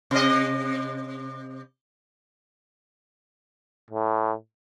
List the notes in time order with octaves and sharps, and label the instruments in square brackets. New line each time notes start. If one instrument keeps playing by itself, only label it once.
[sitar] C3 D#5
[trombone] A2